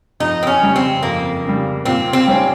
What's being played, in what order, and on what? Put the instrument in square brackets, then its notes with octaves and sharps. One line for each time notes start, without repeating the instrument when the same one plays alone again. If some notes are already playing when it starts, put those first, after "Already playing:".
[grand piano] F2 [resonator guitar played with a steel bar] D#4
[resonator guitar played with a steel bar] C4
C#4
[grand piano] C#3 G3
[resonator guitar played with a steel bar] C4
[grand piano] F2 [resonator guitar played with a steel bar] A#3
[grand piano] C#3 G3
[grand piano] A#2 [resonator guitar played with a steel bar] C4
[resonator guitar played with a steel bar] C4
[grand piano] G3 C#4